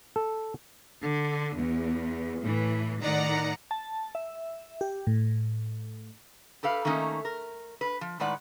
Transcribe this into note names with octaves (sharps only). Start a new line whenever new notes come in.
A4
D3
E2
A2 E3
A2 D#3 D5 F#5 A#5
A5
E5
G4
A2
G4 A4 B4 F5
D#3 A3 A#3 C#4 D#4
A#4
B4
F3
A2 D#3 G#3 B4 D5 F#5